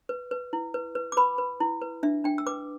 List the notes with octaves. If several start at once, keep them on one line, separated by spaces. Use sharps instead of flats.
B4
B4
E4
B4
B4
D6
B4 B5
B4
E4
B4
D4 E5
D4 G5
E6
B4 D6